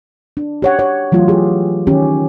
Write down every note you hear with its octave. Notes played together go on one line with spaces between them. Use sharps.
D4
G4 C#5 F#5
C#5
E3 F#3 A3 F4
G4 G#4
D#3 C#4 G4